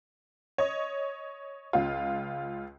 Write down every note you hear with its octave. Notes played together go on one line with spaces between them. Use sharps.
C#5 D#5
C#2 F4